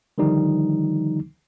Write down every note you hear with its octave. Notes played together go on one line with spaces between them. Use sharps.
D3 D#3 F3 G3 D#4